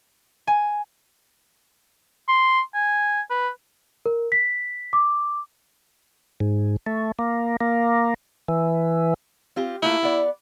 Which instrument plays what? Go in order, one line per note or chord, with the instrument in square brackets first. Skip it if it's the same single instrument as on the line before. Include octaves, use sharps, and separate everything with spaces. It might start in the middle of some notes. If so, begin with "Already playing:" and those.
[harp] G#5
[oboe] C6
G#5
B4
[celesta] A#4
B6
D6
[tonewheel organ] G#2
A3
A#3
A#3
E3
[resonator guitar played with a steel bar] C4 F4 G4
[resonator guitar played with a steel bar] A3 A#3 F4 [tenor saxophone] E4
[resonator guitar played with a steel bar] B3 D5